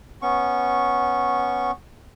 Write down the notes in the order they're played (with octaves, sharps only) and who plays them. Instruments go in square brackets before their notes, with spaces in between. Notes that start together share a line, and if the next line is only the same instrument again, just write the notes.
[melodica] B3 C#4 C#6